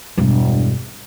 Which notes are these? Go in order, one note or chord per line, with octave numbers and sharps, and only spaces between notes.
E1 G2